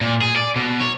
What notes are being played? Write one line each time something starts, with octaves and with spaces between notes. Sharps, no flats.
A#2
G#4
D5
B2
C#5